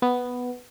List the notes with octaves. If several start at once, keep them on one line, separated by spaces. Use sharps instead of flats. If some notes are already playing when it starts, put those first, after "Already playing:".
B3